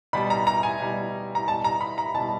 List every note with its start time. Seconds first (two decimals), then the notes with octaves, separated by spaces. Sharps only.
0.13 B2 G3 B5
0.30 A#5
0.47 A#5
0.63 G#5
0.80 B2 G3
1.35 A#5
1.47 B2 G3 A5
1.64 A#5
1.81 B5
1.98 A#5
2.14 B2 A5
2.19 G3